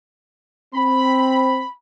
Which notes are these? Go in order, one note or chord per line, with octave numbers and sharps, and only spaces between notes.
C4 B5